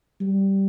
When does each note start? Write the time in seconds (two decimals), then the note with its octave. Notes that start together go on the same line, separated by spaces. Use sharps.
0.21 G3